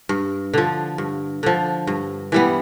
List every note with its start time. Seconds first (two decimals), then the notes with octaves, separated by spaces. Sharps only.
0.09 G2
0.53 D3 F3
0.98 G2
1.43 D3 F3
1.87 G2
2.32 E3 G3 B3